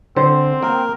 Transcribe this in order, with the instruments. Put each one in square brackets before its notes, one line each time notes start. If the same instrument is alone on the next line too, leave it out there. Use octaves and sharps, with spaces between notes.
[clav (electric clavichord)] D3 [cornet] C4 [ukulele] C5
[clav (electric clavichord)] A#3 [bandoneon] A#4 [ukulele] G5